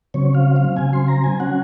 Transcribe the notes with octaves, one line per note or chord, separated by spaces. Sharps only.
C#3 F#3 C4 C#5
F5
F5
C#3 F#3 C4 G#5
C6
A#5
G#5
F#3 C#4 F#5